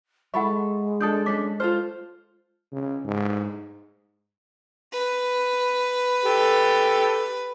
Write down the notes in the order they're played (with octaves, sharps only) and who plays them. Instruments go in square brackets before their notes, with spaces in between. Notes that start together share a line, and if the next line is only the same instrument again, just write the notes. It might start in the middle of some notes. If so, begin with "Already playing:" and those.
[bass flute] G#3 [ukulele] E4 A4 E5 [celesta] F#5 B5 C#6
[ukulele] D4 A4 [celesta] D#6 G6
[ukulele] C#4 D4 A4 [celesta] D6 B6
[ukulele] F4 A4 C5 [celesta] F6
[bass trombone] C#3
G#2
[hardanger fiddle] B4
[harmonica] G4 A4